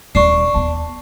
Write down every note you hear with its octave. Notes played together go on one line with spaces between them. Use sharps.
D#1 D4 C#6 C7
D#2 B3 A5